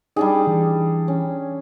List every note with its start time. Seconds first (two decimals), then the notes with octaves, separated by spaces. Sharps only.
0.16 G3 D4 D#4 G#4
0.47 E3
1.08 C#4